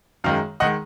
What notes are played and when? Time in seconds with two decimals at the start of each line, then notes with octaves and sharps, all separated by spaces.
0.24 F#2 D#3 G#3 F5
0.60 D#3 G#3 D#5 F#5